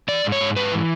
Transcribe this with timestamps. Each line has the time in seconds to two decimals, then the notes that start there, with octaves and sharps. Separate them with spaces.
0.08 E3 D5
0.24 G#2
0.32 C#5
0.41 G#2
0.56 G#2 B4
0.72 E3